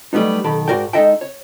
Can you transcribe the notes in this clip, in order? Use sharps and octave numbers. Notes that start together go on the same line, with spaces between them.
F#3 G3 A3 B3 D#4
B1 D#3 G4 A4 B5
G#2 F#4 A#4 D5 G5
G#3 D#4 A4 D#5 E5 G5
C#5